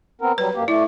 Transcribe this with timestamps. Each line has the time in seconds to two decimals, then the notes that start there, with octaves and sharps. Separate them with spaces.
0.21 B3 C4 A#4
0.38 F#3 G3 B4
0.55 F#2 A#3 G4
0.68 A3 E4 D5